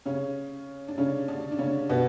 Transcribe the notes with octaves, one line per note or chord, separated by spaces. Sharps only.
C#3 C#4
D4
C#3 C#4
D3 D4
D4
C#3 C#4
B2 B3